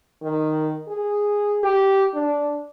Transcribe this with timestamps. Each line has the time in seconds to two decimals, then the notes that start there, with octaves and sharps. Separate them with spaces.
0.23 D#3
0.89 G#4
1.63 G4
2.14 D4